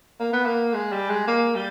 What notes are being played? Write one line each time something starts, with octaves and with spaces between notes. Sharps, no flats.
A#3
B3
A#3
G#3
G3
G#3
A#3
G3